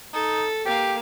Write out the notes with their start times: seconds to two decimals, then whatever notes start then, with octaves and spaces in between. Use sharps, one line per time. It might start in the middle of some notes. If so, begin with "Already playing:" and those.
0.14 D#4 A4
0.66 A#3 G4 F5